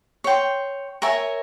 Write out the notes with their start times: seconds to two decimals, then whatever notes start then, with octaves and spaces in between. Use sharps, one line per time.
0.24 C#5 G5 C6
1.02 A#4 C#5 E5 G#5